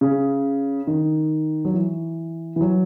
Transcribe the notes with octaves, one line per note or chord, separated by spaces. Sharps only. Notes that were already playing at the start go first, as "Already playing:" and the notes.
C#3
D#3
F#3
E3
E3
F#3